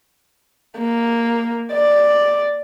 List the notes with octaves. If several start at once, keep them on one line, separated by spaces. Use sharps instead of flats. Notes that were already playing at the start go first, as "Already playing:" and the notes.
A#3
D5